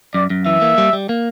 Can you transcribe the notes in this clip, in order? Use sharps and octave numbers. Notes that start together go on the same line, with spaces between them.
F#2 D5
F#2
E3 E5
A#3
G3
G3
A#3